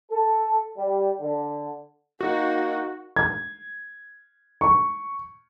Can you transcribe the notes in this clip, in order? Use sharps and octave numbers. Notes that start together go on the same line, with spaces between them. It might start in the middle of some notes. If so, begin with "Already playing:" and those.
A4
G3
D3
A#3 D#4 F#4
G#6
C#6